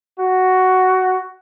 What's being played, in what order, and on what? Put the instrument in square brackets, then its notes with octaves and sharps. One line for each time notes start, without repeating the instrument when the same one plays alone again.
[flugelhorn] F#4